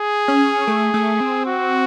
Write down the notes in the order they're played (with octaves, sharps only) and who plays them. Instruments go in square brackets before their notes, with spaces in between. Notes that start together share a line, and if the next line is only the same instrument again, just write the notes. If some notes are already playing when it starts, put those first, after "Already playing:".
Already playing: [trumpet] G#4
[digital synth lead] C#4
A3
A3
C4
[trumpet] F#4